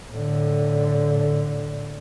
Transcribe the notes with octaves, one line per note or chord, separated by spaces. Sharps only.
A2 D3